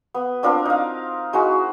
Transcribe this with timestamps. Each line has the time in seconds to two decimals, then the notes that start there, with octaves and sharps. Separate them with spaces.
0.14 B3
0.43 C4 D4 F4 A#4
0.65 D#4 F5
1.33 G#3 D#4 E4 F#4